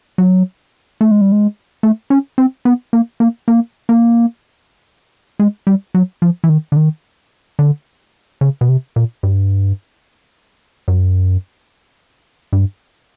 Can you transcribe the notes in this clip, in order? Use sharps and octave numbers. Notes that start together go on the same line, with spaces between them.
F#3
A3
G#3
G3
G#3
A3
C#4
C4
B3
A#3
A#3
A#3
A#3
G#3
G3
F#3
F3
E3
D#3
D3
D#3
D3
C#3
B2
C3
A#2
G2
F#2
G2